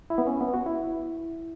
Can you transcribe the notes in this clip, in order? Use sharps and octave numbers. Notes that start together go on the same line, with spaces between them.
E4
B3
C#4
B3
F#4
E4